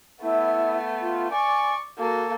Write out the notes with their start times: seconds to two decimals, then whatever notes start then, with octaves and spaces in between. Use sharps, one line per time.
0.23 A3 B3 E4
1.01 F4
1.31 D5 G#5 C#6
1.98 A#3 F#4 A4